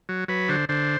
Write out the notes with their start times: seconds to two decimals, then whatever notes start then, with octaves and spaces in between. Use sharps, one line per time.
0.09 F#3
0.28 F#3 B4
0.49 D3 C5
0.69 D3 C5